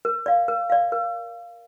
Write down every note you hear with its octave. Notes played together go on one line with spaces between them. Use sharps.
A#4
D5 F5
A#4
D5 F5
A#4